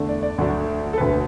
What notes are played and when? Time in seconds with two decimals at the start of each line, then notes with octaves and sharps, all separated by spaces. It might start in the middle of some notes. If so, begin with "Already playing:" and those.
Already playing: E2 D3 A3 D4
0.09 D5
0.23 D5
0.38 D2 D3 F#3 A3 D4
0.93 A4
0.98 E1 D2 D3 B4